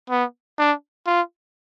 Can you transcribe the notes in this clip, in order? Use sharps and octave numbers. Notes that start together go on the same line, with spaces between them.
B3
D4
F4